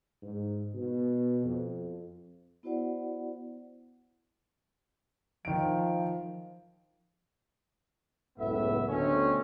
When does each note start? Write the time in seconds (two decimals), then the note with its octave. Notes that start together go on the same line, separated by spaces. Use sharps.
0.23 G#2
0.74 B2
1.45 F2
2.63 B3 E4 F#4 C5 D5 F#5
5.45 D#3 F3 D7
8.39 F#1 C#2 A2 B3 E5
8.87 D2 B2 D3 A3 C4 C#4